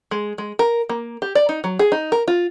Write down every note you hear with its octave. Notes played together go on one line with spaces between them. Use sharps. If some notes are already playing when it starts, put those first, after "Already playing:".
G#3
G#3
A#4
A#3
G4
D5
D#4
F#3
G#4
D#4
A#4
F4